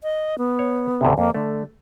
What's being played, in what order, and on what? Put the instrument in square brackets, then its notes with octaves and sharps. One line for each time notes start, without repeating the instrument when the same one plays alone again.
[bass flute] D#5
B3
[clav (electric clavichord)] C#5
D2 A2 C3
[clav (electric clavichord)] F2 [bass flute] A#3
[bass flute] D3 [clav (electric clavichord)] A3